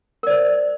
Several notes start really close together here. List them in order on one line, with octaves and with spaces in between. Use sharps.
A#4 D5 C5